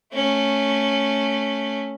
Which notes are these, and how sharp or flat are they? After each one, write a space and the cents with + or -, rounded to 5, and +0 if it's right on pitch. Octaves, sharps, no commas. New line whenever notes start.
A3 +0 C#4 -5